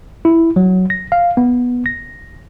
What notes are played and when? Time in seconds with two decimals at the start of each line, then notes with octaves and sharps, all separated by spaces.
0.25 E4
0.56 F#3
0.90 A#6
1.12 F5
1.37 B3
1.86 A#6